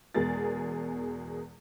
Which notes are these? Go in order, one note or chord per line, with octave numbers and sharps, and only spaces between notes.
E2 B2 G#3 G#4 A#4 A6